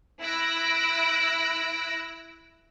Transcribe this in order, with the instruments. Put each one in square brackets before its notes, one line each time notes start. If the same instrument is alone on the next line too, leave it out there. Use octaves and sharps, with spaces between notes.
[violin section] E4 E6 F#6 A#6 D7